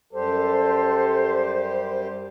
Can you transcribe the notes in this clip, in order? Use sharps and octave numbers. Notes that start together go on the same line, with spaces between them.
F#2 G3 G4 A4 C5